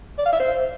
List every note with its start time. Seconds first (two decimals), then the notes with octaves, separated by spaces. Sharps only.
0.18 D5
0.26 F5
0.33 E5
0.40 C5